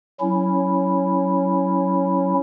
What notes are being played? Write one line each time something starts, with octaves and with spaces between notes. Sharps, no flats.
F#3 C#4 E4